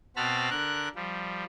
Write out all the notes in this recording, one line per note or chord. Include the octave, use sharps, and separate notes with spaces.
B2 C4 F#4 A5 B5 F6
D3 A#4 F#6
F3 G3